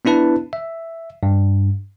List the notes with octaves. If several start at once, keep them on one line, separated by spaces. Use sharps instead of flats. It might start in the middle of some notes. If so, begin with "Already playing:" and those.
B3 D4 E4 B4 A5
E5
G2